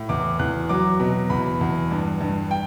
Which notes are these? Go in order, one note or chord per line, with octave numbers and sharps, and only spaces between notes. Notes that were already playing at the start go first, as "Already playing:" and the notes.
Already playing: A2
E2 D6
E2 F#6
F#3 D6
B2
E2 B5
E2
G2
G2
G5